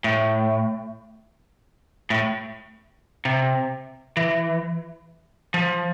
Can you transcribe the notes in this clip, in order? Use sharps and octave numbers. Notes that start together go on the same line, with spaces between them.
A2
A2
C3
E3
F3